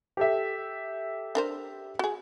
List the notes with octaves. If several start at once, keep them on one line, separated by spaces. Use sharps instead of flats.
G4 A4 E5
D4 A#4 C5
F#4 G#4